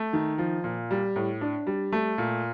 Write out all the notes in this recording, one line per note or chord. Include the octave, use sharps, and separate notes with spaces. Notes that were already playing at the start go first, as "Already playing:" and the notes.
Already playing: A3
D#3
F3
A#2
G3
A2
D4
G3
A3
A#2